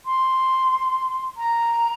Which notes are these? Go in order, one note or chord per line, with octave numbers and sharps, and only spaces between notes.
C6
A#5